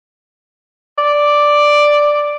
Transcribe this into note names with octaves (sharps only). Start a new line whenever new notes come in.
D5